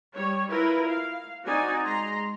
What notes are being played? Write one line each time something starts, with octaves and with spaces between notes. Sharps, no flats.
G3 C#5
E4 F4 A#4 B4
F5
C4 D#4 F#4 D5 G#5
G#3 A#5 C6